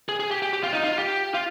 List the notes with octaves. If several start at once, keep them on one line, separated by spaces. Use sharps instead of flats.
G#4
G#4
G4
G4
G4
F4
D#4
F4
G4
F4